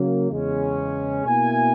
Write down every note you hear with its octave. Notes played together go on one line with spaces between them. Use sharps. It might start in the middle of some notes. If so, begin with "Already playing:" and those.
Already playing: C#3 F#3 A#3
E2 C#3 G#3 C#4
B2 A#3 E4 G#5